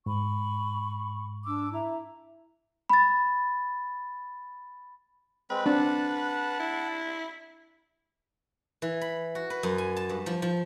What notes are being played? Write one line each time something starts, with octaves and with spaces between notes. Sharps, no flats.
G#2 B5 C#6
D4 D6 E6
E4 E5 A#5
B5 A6
G#3 C4 B4
C4 D4 F#5 A5
E4
E3
B5
F#4
B4
F#2
G#5
A5
G2
F3
F3